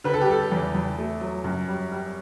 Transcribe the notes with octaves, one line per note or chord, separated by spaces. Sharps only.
D3 B4
A4
G4
G3 A4
E2
E2
A3
F#3
F#2
G3
G3